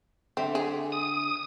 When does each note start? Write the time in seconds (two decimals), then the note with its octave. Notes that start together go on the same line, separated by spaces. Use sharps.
0.37 D3 C4 E5
0.55 G#4
0.92 D#6